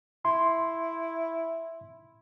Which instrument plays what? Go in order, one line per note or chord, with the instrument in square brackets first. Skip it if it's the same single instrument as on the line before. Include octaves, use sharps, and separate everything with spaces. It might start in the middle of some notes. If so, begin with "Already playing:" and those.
[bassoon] E4 [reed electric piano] C6